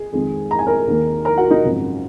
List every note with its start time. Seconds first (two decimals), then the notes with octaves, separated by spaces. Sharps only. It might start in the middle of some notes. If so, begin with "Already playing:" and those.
Already playing: G#4
0.13 F2 D#3 G#3
0.51 A#5
0.59 G#5
0.67 A#4 A#5
0.88 D#2 D#3 A#3
1.25 A#4 A#5
1.38 F#4 F#5
1.51 D#4 D#5
1.63 G#1 F#2 C#3 F3